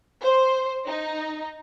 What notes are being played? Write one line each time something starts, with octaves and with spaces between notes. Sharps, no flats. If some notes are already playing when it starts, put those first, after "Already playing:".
C5
D#4